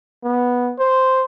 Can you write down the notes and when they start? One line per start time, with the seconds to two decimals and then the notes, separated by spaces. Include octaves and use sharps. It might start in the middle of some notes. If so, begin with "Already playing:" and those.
0.24 B3
0.79 C5